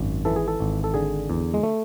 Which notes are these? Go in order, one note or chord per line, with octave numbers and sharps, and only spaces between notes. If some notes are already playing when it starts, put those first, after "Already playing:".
Already playing: G#1 F#2
E3 A4
G#4
A4
G#1
A4
D3 G#4
E2
G#3
A3